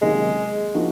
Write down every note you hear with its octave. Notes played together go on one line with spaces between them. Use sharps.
C3 D#3 F#3 G#3 A#3 C#4
F3 A#3 D#4 F#4